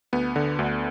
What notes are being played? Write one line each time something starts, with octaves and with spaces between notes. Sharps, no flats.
D2 B3
D3
D2